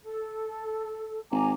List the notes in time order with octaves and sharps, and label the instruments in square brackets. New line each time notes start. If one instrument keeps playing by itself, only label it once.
[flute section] A4
[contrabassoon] G#1 [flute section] G#5 A#5 D6